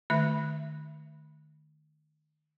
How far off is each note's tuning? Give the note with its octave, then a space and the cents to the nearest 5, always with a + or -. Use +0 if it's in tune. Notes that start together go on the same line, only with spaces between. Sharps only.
D#3 -35 A3 -20 E5 +0